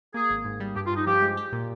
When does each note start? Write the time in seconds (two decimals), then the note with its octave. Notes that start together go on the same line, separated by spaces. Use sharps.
0.14 A#3 G#4
0.30 G#1
0.45 G#2
0.60 G3
0.75 G2 G4
0.86 F4
0.91 G2
0.96 D#4
1.06 F3 G4
1.22 G#3
1.37 G4
1.52 A#2